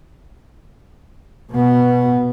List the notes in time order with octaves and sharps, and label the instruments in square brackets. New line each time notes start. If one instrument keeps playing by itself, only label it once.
[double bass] B2 B3